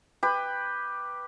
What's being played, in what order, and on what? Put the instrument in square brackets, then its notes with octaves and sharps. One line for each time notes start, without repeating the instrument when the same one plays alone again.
[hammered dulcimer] G4 B4